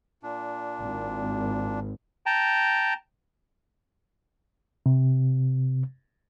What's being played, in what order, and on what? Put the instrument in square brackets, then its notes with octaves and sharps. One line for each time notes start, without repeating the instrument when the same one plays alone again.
[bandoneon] A#2 D4
[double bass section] G#1
[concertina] G5 A5 A#5
[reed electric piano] C3